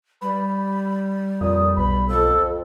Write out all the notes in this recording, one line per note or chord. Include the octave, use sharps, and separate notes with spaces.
G3 B5
F2 A#2 D#6
B1 B5
F2 A4